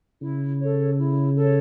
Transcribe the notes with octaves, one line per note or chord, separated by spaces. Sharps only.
C#3 E4
A4 C#5
E4
A4 C#5